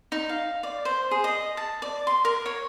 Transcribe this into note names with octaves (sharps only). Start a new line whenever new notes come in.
D#4
F5
D5
C5
G#4
D#5
A5
D5
C6
A#4
C#5